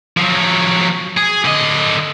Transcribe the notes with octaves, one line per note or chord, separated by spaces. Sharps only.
F3 F#3
G#4
D3 D#5